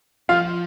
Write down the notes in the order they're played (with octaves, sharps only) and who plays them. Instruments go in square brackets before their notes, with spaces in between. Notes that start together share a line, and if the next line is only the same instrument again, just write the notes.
[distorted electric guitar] F3 [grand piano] F4 F5